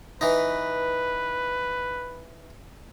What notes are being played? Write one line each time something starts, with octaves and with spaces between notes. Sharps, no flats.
E3 D#4 B4